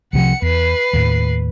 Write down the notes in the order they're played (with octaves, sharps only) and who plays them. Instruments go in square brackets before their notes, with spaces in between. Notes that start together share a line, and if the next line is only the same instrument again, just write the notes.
[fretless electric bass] C2 C3 F3 [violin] F#5 C#7
[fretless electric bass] E2 [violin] B4 C7
[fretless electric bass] D#2 A2